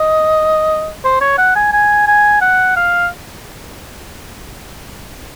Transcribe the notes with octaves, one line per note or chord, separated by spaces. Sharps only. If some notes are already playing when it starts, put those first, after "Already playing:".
Already playing: D#5
C5
C#5
F#5
G#5
G#5
G#5
F#5
F5